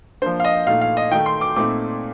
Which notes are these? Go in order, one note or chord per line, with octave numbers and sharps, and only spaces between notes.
F3 A#3 D4 C5
F5
D#5
A#2 A3 D#4 F5
F5
D#5
D#3 A3 D#4 G5
C6
D6
A#2 A3 C4 D#4 D6